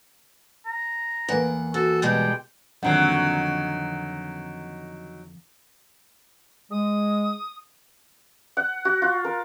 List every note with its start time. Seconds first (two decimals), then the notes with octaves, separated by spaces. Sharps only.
0.66 A#5
1.29 E2 A#3 F#5
1.74 F#4 A4
2.02 B2 G3 G#3 G5
2.83 F2 D3 D#3 F#3 A#3 F#5 A#5
6.71 G#3 D#6
8.57 F#5
8.85 F#4
9.02 F4
9.25 A#4